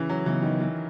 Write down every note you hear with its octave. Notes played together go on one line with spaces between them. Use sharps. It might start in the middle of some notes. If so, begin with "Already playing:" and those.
Already playing: C#3 E3
F#3
C#3 E3 F#3 B3 D#4
D#3
E3